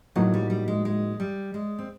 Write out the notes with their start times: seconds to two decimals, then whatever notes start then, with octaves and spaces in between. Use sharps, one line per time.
0.16 A2 F3 F#3 A#3 D#4 F#4
0.34 G3
0.50 G3
0.68 G#3
0.85 G#3
1.20 G3
1.54 G#3
1.79 C4